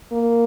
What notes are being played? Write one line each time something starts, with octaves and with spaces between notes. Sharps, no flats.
A#3